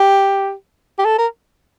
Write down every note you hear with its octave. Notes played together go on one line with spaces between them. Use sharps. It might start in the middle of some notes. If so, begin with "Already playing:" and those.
Already playing: G4
G4
A4
A#4